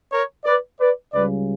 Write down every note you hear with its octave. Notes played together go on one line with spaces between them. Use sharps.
A#4 C#5
B4 D5
B4 D5
C#2 C#3 G3 B4 D5